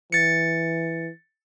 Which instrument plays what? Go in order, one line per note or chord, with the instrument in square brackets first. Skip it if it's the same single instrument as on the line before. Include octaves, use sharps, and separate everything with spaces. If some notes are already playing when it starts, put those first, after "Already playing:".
[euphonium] E3 [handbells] A6 C#7